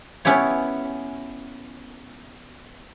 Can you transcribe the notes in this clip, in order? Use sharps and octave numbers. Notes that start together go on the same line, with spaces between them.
B3 C#4 E4 G4 C#5